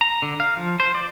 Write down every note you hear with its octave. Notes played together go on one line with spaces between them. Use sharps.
A#5
D3
F5
F3
C5
D5